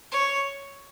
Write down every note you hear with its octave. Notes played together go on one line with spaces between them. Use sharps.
C#5